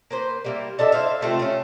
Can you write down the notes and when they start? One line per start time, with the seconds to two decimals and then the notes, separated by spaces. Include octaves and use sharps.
0.11 A#3 B4 C5
0.44 G3 A#3 E4
0.79 D4 A4 D#5 E5
0.92 E4 C5 E5 F5
1.21 C3 A3 C4 F4
1.39 A3 C#4